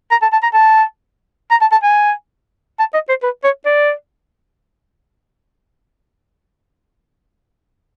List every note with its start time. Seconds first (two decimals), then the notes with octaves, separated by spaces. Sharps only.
0.11 A#5
0.22 A5
0.32 A5
0.43 A#5
0.54 A5
1.51 A#5
1.61 A5
1.72 A5
1.83 G#5
2.79 A5
2.94 D#5
3.09 C5
3.23 B4
3.44 C#5
3.65 D5